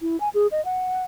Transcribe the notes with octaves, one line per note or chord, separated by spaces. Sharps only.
E4
G#5
G#4
D#5
F#5